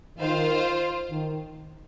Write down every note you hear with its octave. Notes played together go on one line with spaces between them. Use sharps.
D#3 F4 C5 F5
D#3